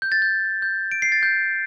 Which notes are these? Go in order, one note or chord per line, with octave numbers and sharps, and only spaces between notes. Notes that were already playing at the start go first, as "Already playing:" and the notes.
G6
A6
G6
G6
D7
C7
A6
G6